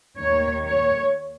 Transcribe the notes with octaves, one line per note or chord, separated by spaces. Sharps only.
D#2 D#3 C#5
C#5